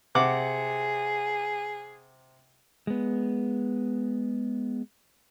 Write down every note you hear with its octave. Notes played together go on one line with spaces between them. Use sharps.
C3 G#4 F#5 D6
G#3 B3